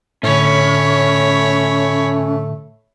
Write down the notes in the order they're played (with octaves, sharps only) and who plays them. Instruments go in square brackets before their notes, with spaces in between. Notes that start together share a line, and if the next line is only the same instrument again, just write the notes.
[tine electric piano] A2 D3 [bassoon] A3 [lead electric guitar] C#4 [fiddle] C#5 B5